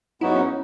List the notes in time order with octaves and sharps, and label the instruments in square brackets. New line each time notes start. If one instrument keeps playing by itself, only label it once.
[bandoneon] G#2 F#3 B3 D#4 F#4 [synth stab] E4
[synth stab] C#4